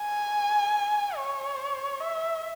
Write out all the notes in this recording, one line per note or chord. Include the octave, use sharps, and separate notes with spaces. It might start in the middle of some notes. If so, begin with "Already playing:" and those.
Already playing: G#5
C#5
E5